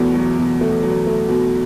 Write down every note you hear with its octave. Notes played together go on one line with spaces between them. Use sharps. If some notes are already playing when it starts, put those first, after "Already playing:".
Already playing: E2 B2 F#3 A3
F#3
B2
A3
F#3
A3
B2